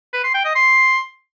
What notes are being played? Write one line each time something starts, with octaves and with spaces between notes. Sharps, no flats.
B4
C6
G5
D#5
C6